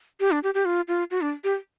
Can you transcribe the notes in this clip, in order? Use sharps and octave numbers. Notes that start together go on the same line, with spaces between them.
G4
D4
G4
G4
F4
F4
F#4
D4
G4